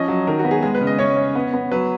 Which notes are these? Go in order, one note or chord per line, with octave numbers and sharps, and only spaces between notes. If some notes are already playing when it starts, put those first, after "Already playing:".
Already playing: F3 C#4 D#5
F#3
D#3 A#4
F#4
B3
G#4
G#3 G#4
B4
C#3
D#5
C#4 C#5
C#4
B3
B3
F#3 B4